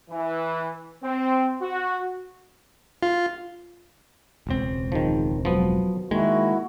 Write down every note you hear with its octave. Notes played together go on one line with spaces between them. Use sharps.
E3
C4
F#4
F4
E1 C#2 C4
G#2 D#3 F3
F3 F#3 B3
D#3 G#3 A#3 E4 F#4